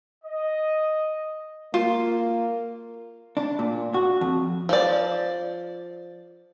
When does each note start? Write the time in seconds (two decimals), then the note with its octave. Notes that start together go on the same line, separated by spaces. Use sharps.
0.24 D#5
1.74 A#3 F4
3.37 D4
3.59 A#2
3.94 F#4
4.21 F2
4.69 F3 D5